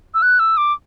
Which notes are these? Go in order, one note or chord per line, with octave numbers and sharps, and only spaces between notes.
E6
F#6
E6
D6